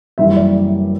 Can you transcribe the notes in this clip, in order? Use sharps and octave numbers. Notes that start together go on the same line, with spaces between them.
F#1 F#2 E3 G3 E5
D5